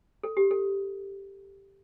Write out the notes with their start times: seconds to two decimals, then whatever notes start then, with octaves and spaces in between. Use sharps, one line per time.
0.24 A4
0.37 G4
0.51 A4